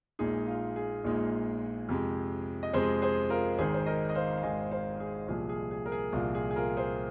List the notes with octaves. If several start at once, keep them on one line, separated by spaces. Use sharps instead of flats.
A#1 A#2 G#3 D#4 G#4
F4
G#4
A#1 A#2 G#3 D#4
F2 C3 G#3
D#5
F2 C3 G#3 G#4 C5
G#4 C5
F4 A#4
G#1 G#2 D#3 G#4 C5
C5
A#4 D#5
D#5
C5 F5
F5
G#1 G#2 D#3 D#5 G#5
C5 F5
G#4
C2 A#2 F3 G#4
G#4
G#4
A#4
G#4
C2 A#2 F3 F4
G#4
G#4
F4 A#4
G#4 C5